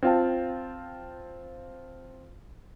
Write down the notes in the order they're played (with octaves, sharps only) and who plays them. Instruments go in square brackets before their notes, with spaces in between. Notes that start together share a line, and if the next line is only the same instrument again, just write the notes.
[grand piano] C4 F4 F5 G5 A5